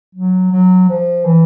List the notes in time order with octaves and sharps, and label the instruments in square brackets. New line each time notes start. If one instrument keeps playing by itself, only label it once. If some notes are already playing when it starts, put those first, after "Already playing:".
[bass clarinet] F#3
F#3
F3
E3